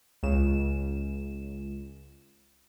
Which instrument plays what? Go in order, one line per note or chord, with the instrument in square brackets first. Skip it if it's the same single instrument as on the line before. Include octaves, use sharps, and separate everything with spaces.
[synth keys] C#2 E7